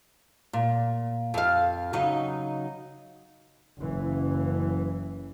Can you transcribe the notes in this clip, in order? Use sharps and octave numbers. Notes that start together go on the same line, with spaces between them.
A#2
F2 F5
C#3 F#3 D#4
F#1 E3